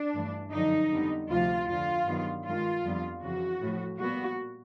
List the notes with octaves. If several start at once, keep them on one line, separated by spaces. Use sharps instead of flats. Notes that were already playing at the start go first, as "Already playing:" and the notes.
Already playing: D4
G2 E3 A3
F#2 D3 F3 D#4
F2 D3 G3 B3
D2 C3 F3 F4
F2 D3 F3 F4
G2 D#3 F#3 B3
G2 D#3 G#3 F4
F2 D3 G3 B3
F2 C#3 E3 F#4
A2 F3 A3
A#2 G3 B3 F#4